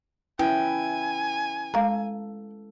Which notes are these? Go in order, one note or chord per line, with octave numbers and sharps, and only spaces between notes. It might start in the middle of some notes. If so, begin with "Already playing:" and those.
C#4 E4 B4 G5 G#5
G#3 A4 F5 A#5